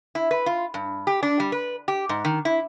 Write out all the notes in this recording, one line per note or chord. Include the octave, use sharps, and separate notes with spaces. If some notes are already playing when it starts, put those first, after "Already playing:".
E4
B4
F4
G2
G4
D4
G3
B4
G4
G#2
D#3
E4